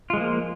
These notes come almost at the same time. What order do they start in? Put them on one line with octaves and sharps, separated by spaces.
F4 G#3 F3 A#3